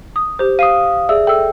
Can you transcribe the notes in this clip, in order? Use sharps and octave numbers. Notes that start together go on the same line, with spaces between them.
D#6
G4 C5
F5 D#6 C7 D#7
G#4 D5 E5 E6
A4 G5 E6